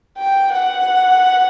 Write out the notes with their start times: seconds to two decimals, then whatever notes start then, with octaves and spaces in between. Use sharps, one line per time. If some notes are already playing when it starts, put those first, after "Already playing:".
0.18 G5
0.53 F#5